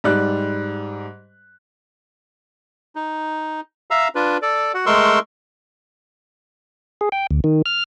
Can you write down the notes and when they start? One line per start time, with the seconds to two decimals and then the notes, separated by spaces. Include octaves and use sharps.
0.04 G#2 G3 D5 F#6
2.96 D#4
3.91 E5 F5 A#5 E6
4.15 D4 F4 B4
4.42 A4 D5
4.74 F#4 F#5
4.86 G#3 A3 A#4 C6 C#6 E6
7.01 G#4
7.12 G5
7.31 D2
7.44 D#3
7.66 F6